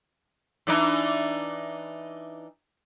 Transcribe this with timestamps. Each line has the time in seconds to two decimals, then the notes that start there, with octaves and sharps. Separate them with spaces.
0.67 E3 D4 D#4